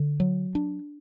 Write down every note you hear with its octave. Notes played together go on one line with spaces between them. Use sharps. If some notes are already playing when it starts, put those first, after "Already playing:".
Already playing: D3
F#3
D4